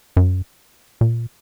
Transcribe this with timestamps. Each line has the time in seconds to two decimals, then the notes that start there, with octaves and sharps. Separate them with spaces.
0.17 F#2
1.01 A#2